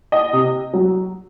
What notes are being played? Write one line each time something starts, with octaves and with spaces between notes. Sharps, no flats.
D#5
C3
F#3